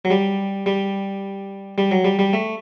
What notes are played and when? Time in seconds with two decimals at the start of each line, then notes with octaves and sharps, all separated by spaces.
0.05 F#3
0.11 G3
0.66 G3
1.78 G3
1.91 F#3
2.05 G3
2.19 G3
2.33 A3